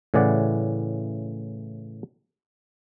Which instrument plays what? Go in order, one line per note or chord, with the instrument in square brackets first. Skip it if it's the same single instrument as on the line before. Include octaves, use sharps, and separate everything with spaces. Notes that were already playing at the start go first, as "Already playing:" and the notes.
[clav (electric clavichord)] A2 C#3 E3 D5 F#5